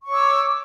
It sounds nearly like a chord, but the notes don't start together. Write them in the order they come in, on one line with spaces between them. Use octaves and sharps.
C#6 C#5 D6 E6